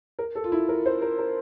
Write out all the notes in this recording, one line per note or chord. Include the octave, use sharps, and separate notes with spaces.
A#4
A4
F4
E4
A#4
C5
A#4
A#4